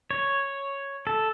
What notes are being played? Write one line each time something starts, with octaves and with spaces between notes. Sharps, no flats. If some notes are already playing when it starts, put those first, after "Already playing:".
C#5
A4